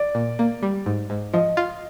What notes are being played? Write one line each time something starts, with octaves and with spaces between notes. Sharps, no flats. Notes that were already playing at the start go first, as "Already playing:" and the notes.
Already playing: D5
A#2
A#3
G3
G#2
G#2
F3 D#5
F4